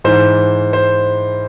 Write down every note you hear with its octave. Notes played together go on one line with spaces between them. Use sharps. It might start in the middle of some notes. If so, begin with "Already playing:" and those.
G#2 E3 C5
C5